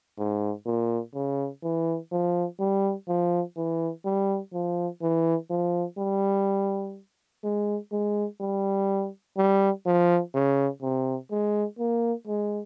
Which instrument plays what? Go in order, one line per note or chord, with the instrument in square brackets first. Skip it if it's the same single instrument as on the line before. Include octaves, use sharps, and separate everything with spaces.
[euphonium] G#2
A#2
C#3
E3
F3
G3
F3
E3
G3
F3
E3
F3
G3
G#3
G#3
G3
G3
F3
C#3
C3
G#3
A#3
G#3